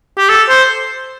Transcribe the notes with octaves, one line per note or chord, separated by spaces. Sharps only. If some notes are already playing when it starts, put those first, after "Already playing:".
G4
A4
C5